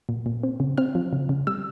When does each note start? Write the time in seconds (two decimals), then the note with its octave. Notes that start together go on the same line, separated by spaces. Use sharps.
0.09 A#2
0.26 A#2
0.43 C4
0.60 C#3
0.77 C4 F6
0.95 F3
1.13 C#3
1.29 C#3
1.47 G3 E6